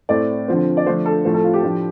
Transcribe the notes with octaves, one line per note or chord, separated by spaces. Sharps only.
A2 A3 C4 D5
D3 F3 C4
D5
D3 F3 A3 D4 C5
A4
A2 F3 A3 C4 C5
A4
F4
G4
A2 F3 D4